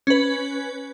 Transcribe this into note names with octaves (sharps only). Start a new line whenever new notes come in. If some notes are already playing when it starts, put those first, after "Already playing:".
C#4 B4